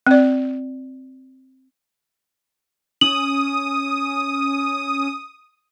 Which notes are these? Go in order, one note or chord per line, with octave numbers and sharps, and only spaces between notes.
C4 D5
C#4 D#6 F#7